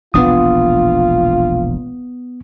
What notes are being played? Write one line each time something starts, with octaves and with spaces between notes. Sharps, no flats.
E1 A#1 B3 D4 F4 D#6